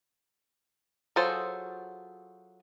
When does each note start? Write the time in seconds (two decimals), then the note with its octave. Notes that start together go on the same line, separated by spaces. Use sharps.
1.16 F#3 F4 G#4 A4 C5